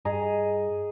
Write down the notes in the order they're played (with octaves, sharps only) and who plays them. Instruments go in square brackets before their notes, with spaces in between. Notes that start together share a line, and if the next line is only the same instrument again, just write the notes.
[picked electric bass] G2 [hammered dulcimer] G#4 D#5 A#5